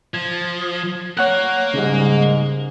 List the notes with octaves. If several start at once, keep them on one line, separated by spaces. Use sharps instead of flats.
F3 G#6
A#3 A#4 C#5 F#5 F#6
G#2 C#3 G3